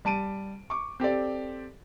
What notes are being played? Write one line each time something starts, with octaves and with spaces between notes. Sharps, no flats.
G3 A5 D7 D#7
C#6 D6
C4 G4 A4 D5